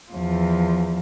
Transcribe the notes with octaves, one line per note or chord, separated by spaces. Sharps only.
E2 F3